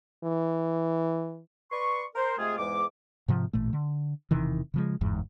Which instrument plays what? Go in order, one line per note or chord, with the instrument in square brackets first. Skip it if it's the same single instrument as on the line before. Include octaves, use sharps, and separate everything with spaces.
[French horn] E3
[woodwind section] B4 D5 C6 C#6
A#4 C5
C3 G#3 A3 F4 G#4
E2 G#2 G#3 D6
[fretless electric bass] G#2 C3 F3
A1 A#2 A3
D3
E1 C3 D#3 E3
C#3 F3 G#3
G1 E2 G#2